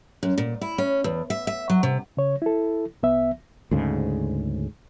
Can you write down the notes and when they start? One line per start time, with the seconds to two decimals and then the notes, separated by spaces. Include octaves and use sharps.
0.23 F#2
0.38 A#2
0.61 E4
0.78 C#4
1.04 E2
1.30 E5
1.47 E5
1.70 F#3
1.83 C3
2.17 C#3 C#5
2.42 E4 A4
3.03 C2 B3 E5
3.71 D2 G#2 C#3